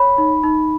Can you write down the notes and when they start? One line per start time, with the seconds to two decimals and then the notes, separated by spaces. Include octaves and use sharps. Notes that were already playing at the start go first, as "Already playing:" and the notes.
Already playing: C#5 B5
0.18 D#4
0.43 D#4